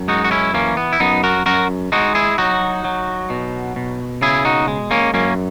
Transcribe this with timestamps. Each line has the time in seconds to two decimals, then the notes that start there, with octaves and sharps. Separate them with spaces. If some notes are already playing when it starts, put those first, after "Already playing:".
Already playing: F#2
0.08 G#3 D#4 F#4
0.25 F#4
0.31 C#4 E4
0.54 E3 A#3 C#4
0.77 B3
0.93 E4
1.00 F#2 B3 D#4
1.24 F#4 A#4
1.46 F#2 F#4 A#4
1.92 G#3 D#4 F#4
2.15 E4 G#4
2.38 F#3 D#4 F#4
2.85 F#3
3.30 B2
3.76 B2
4.22 C#3 E4 G#4
4.45 D#4 F#4
4.68 G#3
4.91 A#3 C#4
5.14 F#2 A#3 C#4